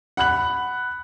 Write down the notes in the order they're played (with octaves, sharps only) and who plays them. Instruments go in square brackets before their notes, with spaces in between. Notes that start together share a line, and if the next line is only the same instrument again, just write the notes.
[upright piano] F#5 B5 F#6 F#7